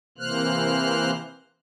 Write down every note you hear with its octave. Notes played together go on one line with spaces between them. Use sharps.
C3 E3 A#3 C5 F6 F#6